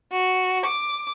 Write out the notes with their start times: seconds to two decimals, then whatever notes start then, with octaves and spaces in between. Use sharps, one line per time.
0.12 F#4
0.66 D6